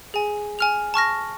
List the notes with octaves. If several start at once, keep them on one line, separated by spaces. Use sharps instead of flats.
G#4 G#5
G#5 F6 F7
A5 C#6 F6 A#6